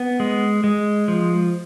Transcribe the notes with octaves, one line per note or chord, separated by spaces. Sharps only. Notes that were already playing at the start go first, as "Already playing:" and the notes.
Already playing: B3
G#3
G#3
F3